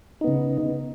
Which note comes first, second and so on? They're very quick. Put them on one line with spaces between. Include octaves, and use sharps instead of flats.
D#4 B3 C#3